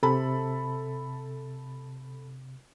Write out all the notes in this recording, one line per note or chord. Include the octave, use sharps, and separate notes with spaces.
C3 A4 B5